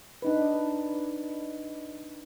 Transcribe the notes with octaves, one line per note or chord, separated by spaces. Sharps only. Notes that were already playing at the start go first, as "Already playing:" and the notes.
D4 D#4 B4